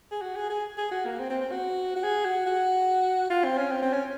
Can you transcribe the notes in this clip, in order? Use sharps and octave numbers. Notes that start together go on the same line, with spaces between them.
G#4
F#4
G#4
G#4
G#4
F#4
A#3
C4
C4
C4
F#4
F#4
G#4
F#4
F#4
F4
C4
C#4
C4
C4
C#4